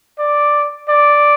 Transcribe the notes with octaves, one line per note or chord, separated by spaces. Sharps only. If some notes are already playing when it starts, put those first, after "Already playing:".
D5
D5